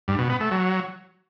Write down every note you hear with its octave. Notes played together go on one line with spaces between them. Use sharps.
G2
B2
B3
A3
F#3